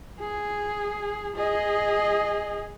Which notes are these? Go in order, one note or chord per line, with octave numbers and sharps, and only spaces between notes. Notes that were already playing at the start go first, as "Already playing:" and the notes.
G#4
G#4 D#5